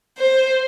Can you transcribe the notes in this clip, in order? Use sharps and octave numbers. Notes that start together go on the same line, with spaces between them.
C5